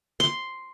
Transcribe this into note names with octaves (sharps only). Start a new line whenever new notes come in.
C6